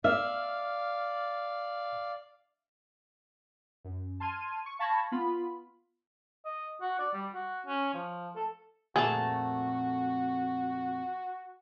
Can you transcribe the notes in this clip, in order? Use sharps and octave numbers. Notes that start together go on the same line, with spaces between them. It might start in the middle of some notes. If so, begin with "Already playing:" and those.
D5 E5 F5 F6
F#2
A5 C6 F6 G#6 D#7
C#6
F5 A5 B5 C#6 G#6 A#6
B3 F4 B5
D#5
F#4
D5
G3
F#4
C#4
F3
A4
F2 A#2 A3 F#4 G#4 A5